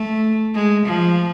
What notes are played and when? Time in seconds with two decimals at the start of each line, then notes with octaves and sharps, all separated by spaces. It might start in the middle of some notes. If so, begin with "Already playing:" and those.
Already playing: A3
0.55 G#3
0.85 F3